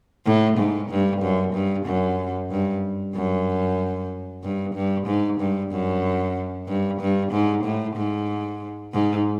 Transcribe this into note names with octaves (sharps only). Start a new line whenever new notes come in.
A2
G#2
G2
F#2
G2
F#2
G2
F#2
G2
G2
G#2
G2
F#2
G2
G2
G#2
A2
G#2
G#2